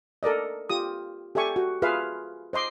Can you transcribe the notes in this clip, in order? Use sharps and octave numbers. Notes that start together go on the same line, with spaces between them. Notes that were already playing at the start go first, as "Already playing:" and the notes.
A4 A#4 D5 D#5
F4 G4 D#6
G4 A4 E5 G#5 C#6
F#4
F4 G#4 B4 E5 F5
C5 D#5 C6 D6